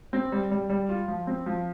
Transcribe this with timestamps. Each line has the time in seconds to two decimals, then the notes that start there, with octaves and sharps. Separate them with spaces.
0.13 C4
0.32 G3
0.51 G3
0.70 G3
0.89 F4
1.08 F3
1.27 C4
1.46 F3